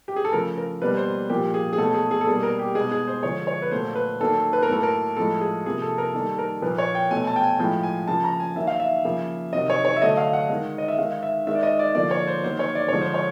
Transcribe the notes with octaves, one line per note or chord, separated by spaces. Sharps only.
G4
G#4
A4
C#3 F3 A3 A#4
A#4
B2 G3 A#3 B4
C5
A#2 F3 A#3 G4
G#4
G#4
B2 F#3 A3 A4
G#4
G#4
A4
B2 G3 A#3 G#4
A#4
G4
B2 G#3 G#4
G#4
C5
D3 F3 G#3 C#5
C#5
B4
A#2 F#3 A3 C5
B4
D#3 F#3 A#3 A4
B4
A#4
A2 F#3 A#3 A4
A#4
A2 F3 G#3 A4
G#4
C3 F3 A#3 G#4
A4
A#4
D#3 G3 A#3 A4
A#4
A#2 F3 A#3 B4
C#5
G5
B2 F#3 A3 G#5
A5
G5
G#5
A2 F3 G#3 G5
G#5
C#3 F3 A#3 A5
A#5
G#5
D#3 F#3 A#3 E5
F5
E5
C#3 F3 A#3
C3 D#3 F#3 D#5
C#5
C#5
E5
D3 F#3 A3 D#5
F5
F#5
D#3 G#3
D#5
E5
D#3 G#3 F5
E5
D#3 G#3 E5
D5
D#5
D5
D3 F3 A#3 D5
C#5
C5
D#3 F#3 A#3 C5
C#5
D5
D3 F3 G#3 C#5
C5
C#5